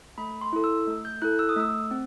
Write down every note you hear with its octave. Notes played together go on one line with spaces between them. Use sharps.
A3 B5
C6
E4 A4
E6
A3
G6
E4 A4 F#6
E6
D#6
A3 E6
C4